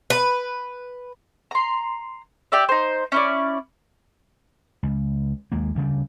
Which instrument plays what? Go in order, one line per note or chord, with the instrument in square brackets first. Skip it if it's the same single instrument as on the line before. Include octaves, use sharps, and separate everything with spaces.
[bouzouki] B4
[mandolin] A#5 C6
G4 D5 E5
D#4 C5
C#4 E4 D5
[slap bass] C#2
D#2 G#3 A#3
D2 C#3 G3